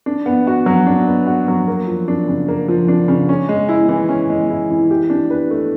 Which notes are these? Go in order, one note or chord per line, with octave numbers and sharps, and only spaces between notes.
D4
B3
F#4
F#3
D4
B3
F#4
F#3
A#3
F3
D4
C#3
A#3
F3
D4
C#3
C#4
G#3
E4
E3
C#4
G#3
E4
E3
G4
D4
B4
A3